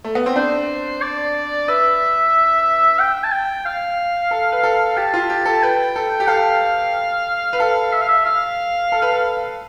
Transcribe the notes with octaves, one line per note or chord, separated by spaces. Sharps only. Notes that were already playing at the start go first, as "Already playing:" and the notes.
A3
B3
C4
D4 C5
D5
B4 E5
G5
A5
G5
F5
A4
B4
A4
G4 A5
F4
G4
A4
A5
B4 G5
A4
G4
A4 F5
B4
A4 F5
E5
F5
E5
F5
A4
B4
A4